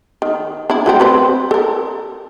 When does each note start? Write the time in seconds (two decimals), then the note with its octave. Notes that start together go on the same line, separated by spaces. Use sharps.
0.22 D#3
0.70 D4 E4
0.86 F#3 A3 C4
1.00 C4 B4 C5
1.51 A4 A#4